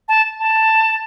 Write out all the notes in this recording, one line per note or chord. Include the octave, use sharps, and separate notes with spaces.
A5
A5